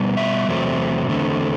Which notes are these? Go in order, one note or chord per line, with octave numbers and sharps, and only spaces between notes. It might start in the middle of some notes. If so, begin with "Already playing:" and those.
Already playing: B2 G3 B3
E5
E2 C3 F#3 A3 C4
E2 D3 A3 C4